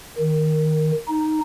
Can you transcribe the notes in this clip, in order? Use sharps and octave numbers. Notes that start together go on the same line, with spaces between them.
D#3
D#4